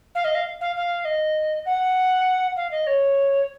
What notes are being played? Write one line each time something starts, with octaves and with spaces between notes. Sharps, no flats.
F5
D#5
F5
F5
F5
D#5
F#5
F5
D#5
C#5